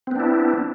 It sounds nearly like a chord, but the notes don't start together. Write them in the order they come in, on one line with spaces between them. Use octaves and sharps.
C4 B3 D4 E4